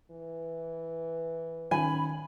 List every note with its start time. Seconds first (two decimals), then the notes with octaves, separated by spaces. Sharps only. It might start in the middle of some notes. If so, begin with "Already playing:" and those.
0.11 E3
1.71 D#3 C#4 G#5 B5